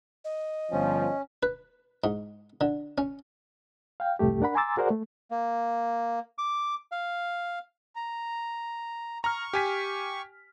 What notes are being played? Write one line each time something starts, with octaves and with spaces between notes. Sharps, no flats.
D#5
G1 F3 C#4
B4
G#2
D3
C#4
F5 G5
C2 F2 G#2 A3 G4
D4 A#4 F#5 B5
G#5 A#5 C6 D6 E6 A6
F#4 G#4 A#4 C5 D5 F#5
A3
A#3
D6
F5
A#5
A#5 C#6 F6
G4 G#5 B6